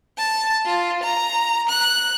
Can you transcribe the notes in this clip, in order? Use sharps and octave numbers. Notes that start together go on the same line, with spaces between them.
A5
F4
A#5
F#6